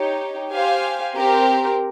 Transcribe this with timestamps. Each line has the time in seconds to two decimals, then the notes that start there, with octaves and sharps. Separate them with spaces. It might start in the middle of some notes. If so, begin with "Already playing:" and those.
Already playing: D#4 G4 C#5
0.52 G4 C5 F5 G#5
1.16 C4 G4 A#4